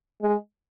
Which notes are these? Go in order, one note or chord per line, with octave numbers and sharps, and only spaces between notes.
G#3